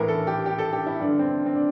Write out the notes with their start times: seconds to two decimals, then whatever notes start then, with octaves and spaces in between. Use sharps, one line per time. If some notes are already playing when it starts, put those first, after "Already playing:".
Already playing: A2 E3 A#4
0.08 A4
0.27 G4
0.46 G4
0.59 A4
0.73 G4
0.86 E4
1.00 G2 D3 D4
1.19 C4
1.46 C4
1.56 D4